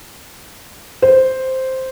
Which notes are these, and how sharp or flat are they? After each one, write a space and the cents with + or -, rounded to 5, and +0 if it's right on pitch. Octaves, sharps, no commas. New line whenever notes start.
C5 +0